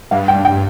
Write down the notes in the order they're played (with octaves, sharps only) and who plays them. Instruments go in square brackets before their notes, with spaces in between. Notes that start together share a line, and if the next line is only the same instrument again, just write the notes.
[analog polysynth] G2 [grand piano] F5
[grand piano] G5
[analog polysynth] G2
[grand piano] G5